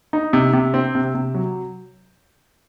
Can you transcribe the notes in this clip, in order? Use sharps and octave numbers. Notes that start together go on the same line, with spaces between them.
D#4
C3
C3
C4
C3
C3
F#3